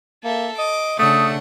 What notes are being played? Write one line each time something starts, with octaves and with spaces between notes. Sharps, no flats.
A#3 A4 E5
D#5 D6
C#3 A3 D4 F#5 D#6